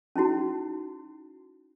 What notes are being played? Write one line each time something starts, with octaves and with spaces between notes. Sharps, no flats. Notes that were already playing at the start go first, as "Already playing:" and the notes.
C#4 D#4 E4 F#4